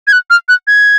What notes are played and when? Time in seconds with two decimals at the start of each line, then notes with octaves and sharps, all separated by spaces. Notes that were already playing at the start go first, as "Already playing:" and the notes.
0.07 G#6
0.13 F#6
0.30 F6
0.48 F#6
0.67 G#6